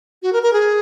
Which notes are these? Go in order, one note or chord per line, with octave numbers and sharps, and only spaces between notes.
F#4
A#4
A#4
G#4